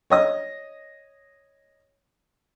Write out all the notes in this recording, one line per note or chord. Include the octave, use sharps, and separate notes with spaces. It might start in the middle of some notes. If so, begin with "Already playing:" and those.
C#5 D#5 D#6